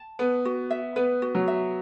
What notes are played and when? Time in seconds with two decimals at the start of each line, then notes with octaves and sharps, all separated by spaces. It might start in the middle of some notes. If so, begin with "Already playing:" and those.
Already playing: A5
0.19 B3 B4
0.45 F#4
0.71 E5
0.96 B3 B4
1.22 F#4
1.35 F#3
1.48 E5